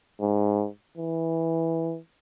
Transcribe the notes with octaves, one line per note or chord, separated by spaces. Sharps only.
G#2
E3